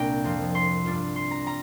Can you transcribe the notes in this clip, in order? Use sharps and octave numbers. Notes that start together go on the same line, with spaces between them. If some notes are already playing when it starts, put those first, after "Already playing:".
Already playing: C2 A#2 A#3 D4 G5 A#5
F2 F3 C4 F4
C6
G2 G3 D4 F4
C6
A#5
G3 A#5